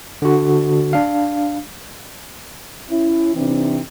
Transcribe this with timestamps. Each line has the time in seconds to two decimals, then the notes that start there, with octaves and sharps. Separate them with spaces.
0.22 D3 F#4
0.93 D4 F5
2.88 C#4 E4
3.35 C3 E3 C4 D4 D#4